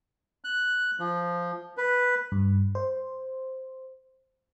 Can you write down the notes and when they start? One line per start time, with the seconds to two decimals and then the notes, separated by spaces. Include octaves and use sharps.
0.44 F#6
0.99 F3
1.77 B4
2.32 G2
2.75 C5